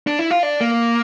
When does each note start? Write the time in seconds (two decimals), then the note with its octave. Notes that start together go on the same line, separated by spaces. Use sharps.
0.07 D4
0.19 E4
0.31 F4
0.43 D4
0.61 A#3